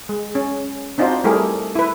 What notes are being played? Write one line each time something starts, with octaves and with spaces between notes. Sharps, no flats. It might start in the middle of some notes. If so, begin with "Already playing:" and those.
G#3
C#4
C4 D4 D#4 F4 F#4 C5
G3 A3 E4 G4 G#4 A#4
E4 B4